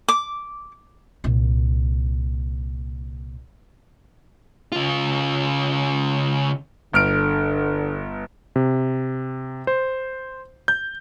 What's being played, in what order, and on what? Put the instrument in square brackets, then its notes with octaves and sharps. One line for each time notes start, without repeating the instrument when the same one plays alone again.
[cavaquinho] D6
[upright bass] C2 A#2
[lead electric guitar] C#3 F4
[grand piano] G1 F6 D7 [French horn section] D3
[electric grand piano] C3
C5
G6